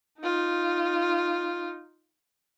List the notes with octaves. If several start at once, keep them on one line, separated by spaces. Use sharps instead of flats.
D#4 F4